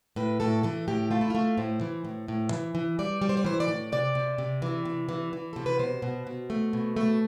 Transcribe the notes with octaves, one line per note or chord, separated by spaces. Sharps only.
A2 B4
A2 A4
E3 A4
A2 G4
A3 F4
E4
A3 F4
A2 C5
E3
A2
A2
E3
E3
G3 D5
G3
C5
D5
E3 C5
D5
A2
C3 D5
C3
C3
E3
C3
E3
E3
C3 A4
B4
B2 C5
B2
B2
A3
B2
A3